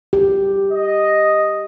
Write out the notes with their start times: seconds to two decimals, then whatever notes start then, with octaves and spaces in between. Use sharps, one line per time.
0.13 G4
0.72 D#5